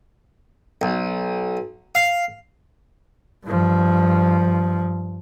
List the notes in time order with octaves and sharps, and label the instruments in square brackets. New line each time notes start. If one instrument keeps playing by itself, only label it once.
[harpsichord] B1
F5
[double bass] G2 F3